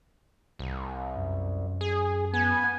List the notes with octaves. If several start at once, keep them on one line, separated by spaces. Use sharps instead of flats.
C2
F#2
G#4
B3 G#5